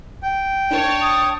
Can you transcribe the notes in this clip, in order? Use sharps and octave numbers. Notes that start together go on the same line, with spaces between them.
G5
D4 A#4 C#5 A5
D#6